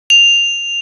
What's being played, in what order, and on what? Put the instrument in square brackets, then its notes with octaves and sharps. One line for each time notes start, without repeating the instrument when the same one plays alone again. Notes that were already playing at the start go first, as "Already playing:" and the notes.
[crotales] F7